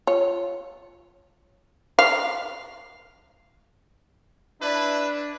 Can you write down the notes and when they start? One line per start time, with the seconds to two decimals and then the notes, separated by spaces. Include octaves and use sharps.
0.07 F4 C#5
1.99 F5
4.62 D4 E4 B4